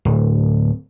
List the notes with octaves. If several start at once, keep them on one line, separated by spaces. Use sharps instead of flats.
D1